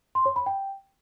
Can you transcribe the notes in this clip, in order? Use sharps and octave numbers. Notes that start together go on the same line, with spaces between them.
C6
C#5
B5
G5